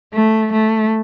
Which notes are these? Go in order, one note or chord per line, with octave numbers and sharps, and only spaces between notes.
A3
A3